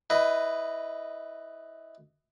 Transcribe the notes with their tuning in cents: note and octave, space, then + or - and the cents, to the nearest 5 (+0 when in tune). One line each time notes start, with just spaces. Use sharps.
E4 -20 B4 +15 D#5 -10